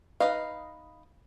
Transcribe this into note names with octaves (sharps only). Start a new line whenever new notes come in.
D#4 B4 D#5 F5